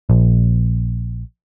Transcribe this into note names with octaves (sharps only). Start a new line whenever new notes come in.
A#1